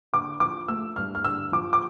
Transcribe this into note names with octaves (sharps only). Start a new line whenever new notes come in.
D3 D6
F3 D6
A3 E6
G2 F6
F6
D3 E6
F3 D6
D6